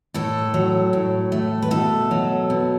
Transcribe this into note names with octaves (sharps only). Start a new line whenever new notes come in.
A2 A4
F#3
A2
A3
B4
B2 A4
F#3
B2